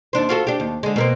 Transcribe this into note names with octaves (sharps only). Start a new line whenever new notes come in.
D#2 D4 C5
F4 F#4 A4
D4 G4
D#2
D3 G#3
B2 A#3 C4